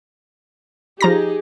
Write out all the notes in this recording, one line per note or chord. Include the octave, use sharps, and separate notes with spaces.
F3 D#4 G4 G#4 A#5 A#6